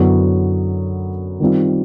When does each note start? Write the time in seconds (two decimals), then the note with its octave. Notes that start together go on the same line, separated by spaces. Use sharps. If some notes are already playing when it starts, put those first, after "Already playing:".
Already playing: F#2 D3 F#3 B3 E4
1.40 D#3 G3 C4 F4